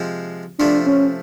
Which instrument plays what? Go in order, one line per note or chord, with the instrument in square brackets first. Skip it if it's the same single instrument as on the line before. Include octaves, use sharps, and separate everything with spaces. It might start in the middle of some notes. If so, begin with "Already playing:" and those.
Already playing: [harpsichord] C3 F3 G#3 C4
[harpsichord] C3 F3 A3 [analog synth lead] D4
[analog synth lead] C#4